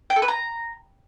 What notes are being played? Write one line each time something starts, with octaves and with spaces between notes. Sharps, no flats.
G5
A4
B4
A#5